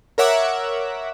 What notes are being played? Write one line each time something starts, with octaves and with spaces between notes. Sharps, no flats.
A#4 C#5 E5 F#5 D6